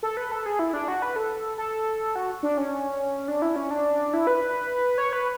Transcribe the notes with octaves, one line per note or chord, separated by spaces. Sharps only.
A4
B4
A4
G#4
E4
D4
F#4
B4
A4
A4
F#4
D4
C#4
D4
E4
C#4
D4
E4
B4
C#5
B4